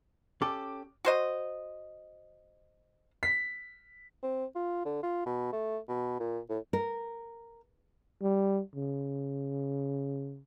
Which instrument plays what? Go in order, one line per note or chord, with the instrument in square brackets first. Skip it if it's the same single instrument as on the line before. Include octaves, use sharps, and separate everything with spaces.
[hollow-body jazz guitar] C#4 G4 A4 [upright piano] D6
[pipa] F#4 C5 D#5
[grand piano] B6
[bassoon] C4
F4
D3
F4
B2
A3
B2
A#2
A2
[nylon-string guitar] A#4
[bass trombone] G3
C#3